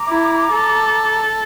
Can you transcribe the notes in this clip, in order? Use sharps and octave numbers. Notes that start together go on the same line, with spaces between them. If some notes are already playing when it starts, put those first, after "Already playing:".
Already playing: A#5 D6
E4
A4